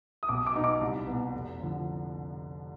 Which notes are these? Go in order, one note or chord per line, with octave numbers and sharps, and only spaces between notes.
D#6
B1 D6
D6
B2 B3 D#4
D6
C2
B2 B3
F1
D3 F3